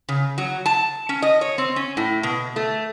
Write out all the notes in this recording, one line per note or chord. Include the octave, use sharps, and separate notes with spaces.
C#3
F#3
A5
C#4
D#5
C#5
C4
C#4
A2
B2
A3